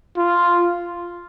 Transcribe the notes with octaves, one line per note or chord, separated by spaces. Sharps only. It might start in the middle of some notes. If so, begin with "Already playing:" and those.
F4